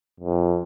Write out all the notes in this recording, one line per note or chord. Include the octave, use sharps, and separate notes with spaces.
F2